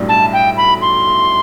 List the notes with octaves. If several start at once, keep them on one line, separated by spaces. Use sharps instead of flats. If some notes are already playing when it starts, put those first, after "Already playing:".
Already playing: B1 A2 G3 D4
A5
G5
B5
C6